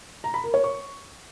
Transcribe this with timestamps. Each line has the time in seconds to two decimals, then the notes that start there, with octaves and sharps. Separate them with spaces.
0.24 A#5
0.34 B5
0.44 A#4
0.54 C#5
0.64 C#6